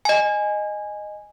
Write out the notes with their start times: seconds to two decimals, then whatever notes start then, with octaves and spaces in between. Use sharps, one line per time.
0.05 D#5 G#5